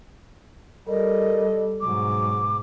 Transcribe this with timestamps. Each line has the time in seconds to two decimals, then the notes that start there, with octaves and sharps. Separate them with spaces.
0.89 G3 A4 A#4 D#5
1.81 G#2 B2 F#3 D6